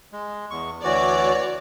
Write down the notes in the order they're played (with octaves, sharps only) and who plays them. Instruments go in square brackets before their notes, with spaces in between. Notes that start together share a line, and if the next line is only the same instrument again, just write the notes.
[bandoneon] G#3
E2 C#6
[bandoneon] D2 E3 F#4 [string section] C#5 D5